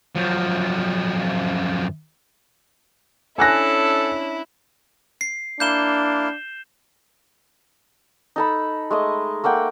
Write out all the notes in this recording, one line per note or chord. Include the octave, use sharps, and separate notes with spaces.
F#2 F3
C#4 D4 E4 A4 G#5 F#6 A#6
C7
A#3 D4 E4 F5 G6 E7 G7
D#4 A4 B5
G#3 A3 D#5
A3 A#3 F#5 G5